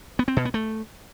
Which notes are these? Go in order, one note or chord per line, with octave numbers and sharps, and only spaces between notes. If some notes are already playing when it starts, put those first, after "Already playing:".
B3
C4
B2
B3
A3